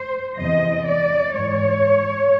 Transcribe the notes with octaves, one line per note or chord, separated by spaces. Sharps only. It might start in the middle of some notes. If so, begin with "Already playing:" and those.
Already playing: C5
E2 C3 E3 D#5
D5
G#2 E3 C#5